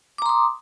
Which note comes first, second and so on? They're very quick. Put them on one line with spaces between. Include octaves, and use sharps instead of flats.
D6 A#5 C6 D#6